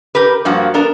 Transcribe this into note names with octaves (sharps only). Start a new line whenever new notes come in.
G4 A#4 B4
G2 F3 A#3 F#4
B3 D4 A#4